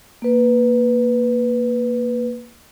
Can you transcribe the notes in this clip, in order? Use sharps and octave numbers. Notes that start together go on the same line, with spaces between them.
A#3 B4